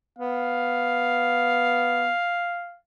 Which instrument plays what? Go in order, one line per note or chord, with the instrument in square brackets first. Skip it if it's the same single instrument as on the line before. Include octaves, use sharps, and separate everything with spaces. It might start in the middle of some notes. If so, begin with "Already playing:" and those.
[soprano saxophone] B3 [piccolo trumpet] F5